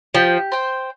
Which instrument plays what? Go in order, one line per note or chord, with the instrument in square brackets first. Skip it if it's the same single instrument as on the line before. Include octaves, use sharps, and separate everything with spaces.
[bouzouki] F3 [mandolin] G4
[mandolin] C5 G5